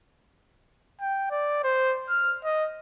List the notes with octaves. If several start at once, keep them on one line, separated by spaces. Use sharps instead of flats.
G5
D5
C5
F6
D#5